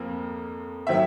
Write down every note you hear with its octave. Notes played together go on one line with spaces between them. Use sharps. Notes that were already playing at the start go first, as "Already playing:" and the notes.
Already playing: F2 F3 A#3
D#3 F#3 E5